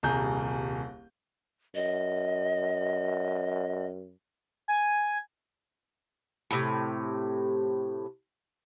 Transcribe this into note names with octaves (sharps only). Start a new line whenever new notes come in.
D#1 C2 G#4 A#5 G6
F#2 D#5
G#5
A2 C3